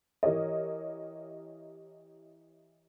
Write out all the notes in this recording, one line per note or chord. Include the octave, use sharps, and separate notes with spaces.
E3 G4 A#4 C#5 D#5